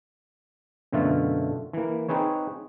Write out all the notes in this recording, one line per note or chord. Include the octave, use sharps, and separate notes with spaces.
F#2 B2 D3 A3 F4 E5
E3 A#3
C4 D#4 G#4 B4 C#5